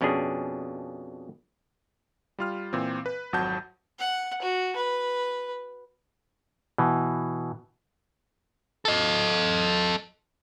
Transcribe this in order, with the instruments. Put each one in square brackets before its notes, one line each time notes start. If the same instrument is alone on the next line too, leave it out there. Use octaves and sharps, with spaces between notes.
[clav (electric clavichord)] F2 B2 C#4 D4 G#4
[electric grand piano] G3 F4 F6
A#2 E3 C4
B4
G#1 F2 F#3 F#5 A5 G6
[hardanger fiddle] F#5
F#4
B4
[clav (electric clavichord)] B2 E3
[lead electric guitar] A4 D#5